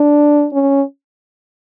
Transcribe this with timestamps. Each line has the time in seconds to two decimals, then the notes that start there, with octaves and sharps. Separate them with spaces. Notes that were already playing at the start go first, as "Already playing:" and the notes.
Already playing: D4
0.53 C#4